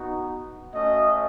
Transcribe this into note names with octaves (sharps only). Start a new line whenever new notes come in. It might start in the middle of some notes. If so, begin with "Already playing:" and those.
Already playing: B3 D#4 F#4
A3 C#4 F#4 D#5